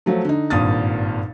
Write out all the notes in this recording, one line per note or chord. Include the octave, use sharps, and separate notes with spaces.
F3 F#3 A3
D3 D#4
G#1 G2 A#2 D#6 A6